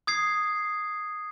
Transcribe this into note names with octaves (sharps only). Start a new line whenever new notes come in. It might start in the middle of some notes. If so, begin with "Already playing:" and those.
D#6 G#6 C7